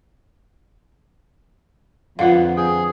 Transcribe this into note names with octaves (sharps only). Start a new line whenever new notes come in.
F2 D3 B3 F4 F5
G#4 G5